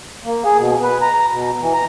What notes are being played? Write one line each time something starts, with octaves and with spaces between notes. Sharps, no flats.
A#3
G#4
B2
B4
A#5
A#5
B2
E3
A#5